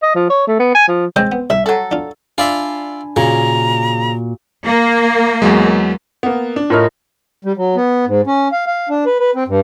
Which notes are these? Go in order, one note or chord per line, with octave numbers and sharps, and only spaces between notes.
D#5
F3
C#5
A3
B3
G#5
F3
C#3 G#3 C4 C5
B3
C2 E5
F#3 A4
D4 F4
D4 F4 D5 E5 G#5 B5
A#2 C#3 F#4 A#5
A#3
E2 F#3 G#3
A#3 B3
D4
A2 F4 A#4 C#5 D#5 F6
G3
F#3
B3
G#2
C#4
F5
F5
D4
B4
B4
C4
G2